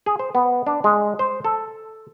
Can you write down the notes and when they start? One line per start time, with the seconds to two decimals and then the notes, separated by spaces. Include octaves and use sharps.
0.06 G#4
0.19 C5
0.35 B3
0.67 D4
0.84 G#3
1.19 C5
1.45 A4